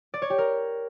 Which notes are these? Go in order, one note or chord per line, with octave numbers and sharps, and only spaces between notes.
D5
C#5
G4
A#4